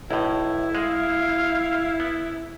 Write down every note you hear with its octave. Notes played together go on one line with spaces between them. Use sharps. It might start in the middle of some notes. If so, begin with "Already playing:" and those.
B1 A2 E4
G#3 F5
B3